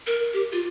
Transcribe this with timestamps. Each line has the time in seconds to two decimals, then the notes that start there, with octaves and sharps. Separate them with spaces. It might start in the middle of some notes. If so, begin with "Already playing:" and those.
0.07 A#4
0.33 G4
0.52 F4